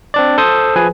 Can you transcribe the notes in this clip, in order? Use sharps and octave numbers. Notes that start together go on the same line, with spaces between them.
C4 D4 D5
A4 C5 C6 D#6
F3 G#4 B4 G#5